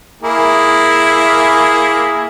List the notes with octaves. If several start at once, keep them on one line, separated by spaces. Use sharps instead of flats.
A#3 E4 G#4